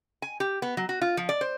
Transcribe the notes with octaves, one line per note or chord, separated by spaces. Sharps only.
G#5
G4
B3
F#3
F#4
F4
F3
D5
C5